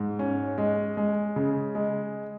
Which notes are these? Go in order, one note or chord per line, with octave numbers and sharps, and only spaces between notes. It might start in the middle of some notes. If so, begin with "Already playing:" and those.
Already playing: G#2
C#4
G#3
G#3
C#3
G#3